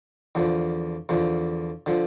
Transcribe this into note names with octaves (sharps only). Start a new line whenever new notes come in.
E2 D3 F3
E2 D3 F3
D3 F3